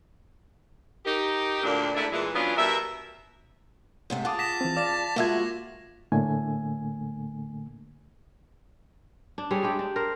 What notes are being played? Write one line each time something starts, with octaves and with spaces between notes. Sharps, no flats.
D#4 G4 A#4
D2 A#2 D4
G#2 A3 D4 E4
A#2 E3 G#3
E3 F#3 B3 C#4 D4 F4
B2 G3 A#4 E5
G#2 C3 A3
F4 G#4 F#5 A5 D6 D#6
A#6 B6 E7
E3 C4
D5 F5 D6 A6 E7
G#3 A#3 F4 F#4 E5 G#6
A2 D3 A3 A#3 G#5
D4
G3 G#4 A4 C#5
G#3 D4 G4
D4
A#4 C5